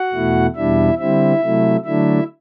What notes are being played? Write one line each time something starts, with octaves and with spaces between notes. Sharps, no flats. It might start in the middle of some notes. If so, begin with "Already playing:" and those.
Already playing: F#4 F#5
E2 B2 A3 E4
E2 B2 G3 D4 E4 E5
D3 G3 C4 E4 E5
C3 F#3 A3 E4
D3 F#3 A3 D4 E4 E5